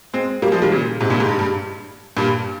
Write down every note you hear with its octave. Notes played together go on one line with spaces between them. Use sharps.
G#3 C4
G3 A#3
F3 G#3
D#3 G3
A#2 C#3
G#2 C3
G2 A#2
G#2
G2
G2
G2 A#2